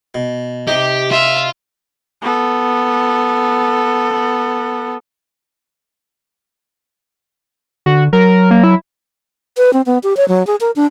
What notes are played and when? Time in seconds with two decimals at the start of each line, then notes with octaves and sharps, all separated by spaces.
0.15 B2
0.67 C3 D#4 G4
1.11 F4 E5
2.22 B3 A4
7.86 D3 F#4
8.13 F#3 A#4
8.51 A#3
8.63 E4
9.57 B4
9.73 C4
9.86 B3
10.03 G4
10.17 C#5
10.28 F#3
10.47 G#4
10.61 A#4
10.76 D4